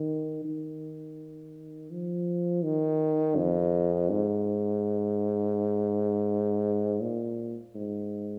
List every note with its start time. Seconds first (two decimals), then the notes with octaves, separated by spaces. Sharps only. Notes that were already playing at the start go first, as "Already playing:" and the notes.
Already playing: D#3
0.45 D#3
1.91 F3
2.64 D#3
3.37 F2
4.10 G#2
7.02 A#2
7.75 G#2